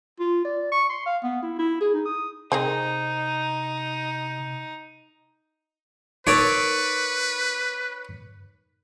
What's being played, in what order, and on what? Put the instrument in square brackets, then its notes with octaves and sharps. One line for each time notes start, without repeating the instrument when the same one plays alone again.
[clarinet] F4
D5
C#6
C6
F5
B3
E4
E4
G#4
D#4
D#6
[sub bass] C3 [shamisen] C4 G#4 A#4 [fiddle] D#4
[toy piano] D#4 A#4 [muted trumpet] B4 [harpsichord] C#5 D5